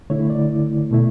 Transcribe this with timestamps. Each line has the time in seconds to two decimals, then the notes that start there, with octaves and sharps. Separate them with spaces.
0.10 D3 A3 E4 C#5
0.30 D5
0.91 B2 A3 E4